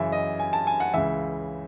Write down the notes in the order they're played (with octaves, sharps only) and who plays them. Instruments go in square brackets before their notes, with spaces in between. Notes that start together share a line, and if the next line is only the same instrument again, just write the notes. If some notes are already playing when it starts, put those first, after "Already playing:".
Already playing: [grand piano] F#2 C#3 E3 E5
D#5
G#5
A5
G#5
F#5
C#2 C#3 E3 E5